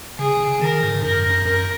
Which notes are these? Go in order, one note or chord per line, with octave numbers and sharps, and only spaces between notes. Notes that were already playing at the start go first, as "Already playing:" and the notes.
C#3 G#4
C#3
D#3 A#4
G#2
F#2 A#4
F#2
F#2 A#4